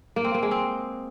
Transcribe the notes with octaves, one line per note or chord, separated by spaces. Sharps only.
A#3
C4
A#3
G#3
C4